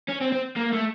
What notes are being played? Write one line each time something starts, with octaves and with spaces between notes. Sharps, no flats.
C#4
C4
C4
A#3
A3